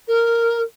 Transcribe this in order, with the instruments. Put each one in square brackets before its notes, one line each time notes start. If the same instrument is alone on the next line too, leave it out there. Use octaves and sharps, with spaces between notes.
[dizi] A#4